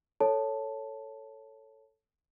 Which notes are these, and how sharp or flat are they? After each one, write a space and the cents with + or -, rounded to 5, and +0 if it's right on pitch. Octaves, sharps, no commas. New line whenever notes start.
A4 +5 C#5 +0 A5 +0